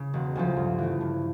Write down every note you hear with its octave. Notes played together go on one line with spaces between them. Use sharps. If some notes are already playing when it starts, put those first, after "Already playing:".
Already playing: C#3
E1
D2 C#3 F3
G2
E3 A3
G2